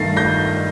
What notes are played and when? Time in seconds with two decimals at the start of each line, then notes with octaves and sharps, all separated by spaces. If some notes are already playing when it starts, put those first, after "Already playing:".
Already playing: G2 D#3 A3 A6 A#6 C7
0.17 G6 A#6